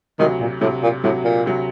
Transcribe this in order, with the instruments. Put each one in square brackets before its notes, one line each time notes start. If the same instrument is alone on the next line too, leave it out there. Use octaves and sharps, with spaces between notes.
[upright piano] D2 C3 F#3 [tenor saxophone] D#3
[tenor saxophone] A#2
[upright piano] D2 C3 F#3 [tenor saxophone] A2
[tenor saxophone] A#2
[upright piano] D2 C3 F#3 [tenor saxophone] A2
[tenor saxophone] A#2
[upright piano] D2 C3 F#3